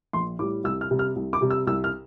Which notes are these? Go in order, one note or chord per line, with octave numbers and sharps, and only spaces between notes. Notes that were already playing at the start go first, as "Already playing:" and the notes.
A#1 C6
A2 G3 D6
C2 E6
F6
C3 G3
F6
C2
D6
C3 G3
E6
C2 E6
F6